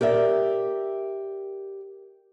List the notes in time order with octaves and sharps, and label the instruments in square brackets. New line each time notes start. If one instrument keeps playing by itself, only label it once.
[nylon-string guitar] G4 A#4 D5 E5